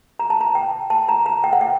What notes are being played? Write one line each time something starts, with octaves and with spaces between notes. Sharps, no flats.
A#5
A5
A#5
G5
A5
A#5
A#5
G5
F#5
G5